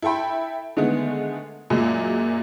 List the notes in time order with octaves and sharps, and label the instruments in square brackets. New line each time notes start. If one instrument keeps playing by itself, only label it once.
[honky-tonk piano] E4 A4 E5 G5 B5
D3 D#3 G#3 A3 B3
F#2 A#2 F#3 G#3